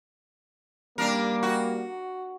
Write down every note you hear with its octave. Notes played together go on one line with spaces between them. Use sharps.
G3 A#3 D4 A#4
F#4